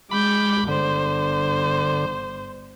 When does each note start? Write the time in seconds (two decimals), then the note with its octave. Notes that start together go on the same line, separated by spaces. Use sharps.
0.11 G#3 B5 D6 G6
0.68 G1 D3 C5